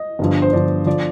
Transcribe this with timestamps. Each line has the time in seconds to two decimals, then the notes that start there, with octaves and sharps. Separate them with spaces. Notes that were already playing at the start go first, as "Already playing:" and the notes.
Already playing: D#5
0.19 G1 G2 F3
0.42 C5
0.53 G1 G2 F3 D5
0.86 D3 F3 D5